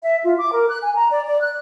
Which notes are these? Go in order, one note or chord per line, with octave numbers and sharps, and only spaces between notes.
E5
F4
D6
A#4
F#6
G#5
A#5
D5
D5
F#6